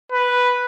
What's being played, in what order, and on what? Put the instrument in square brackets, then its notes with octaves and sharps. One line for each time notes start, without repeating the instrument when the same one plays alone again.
[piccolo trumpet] B4